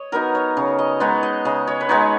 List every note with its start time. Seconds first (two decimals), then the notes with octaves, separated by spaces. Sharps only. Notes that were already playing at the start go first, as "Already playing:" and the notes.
Already playing: C#5 D#5
0.12 F#3 B3 D#4 A#4
0.35 C#5
0.57 C#3 C#5
0.79 D#5
1.00 G#3 B3 D#4 C#5
1.23 D#5
1.45 C#3 D#5
1.67 C#5
1.81 B4
1.89 G#3 B3 D#4 C#5